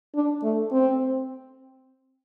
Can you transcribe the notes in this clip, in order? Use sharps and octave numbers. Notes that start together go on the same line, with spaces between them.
D4
A3
C4